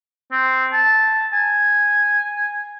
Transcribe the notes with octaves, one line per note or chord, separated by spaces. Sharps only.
C4
A5
G#5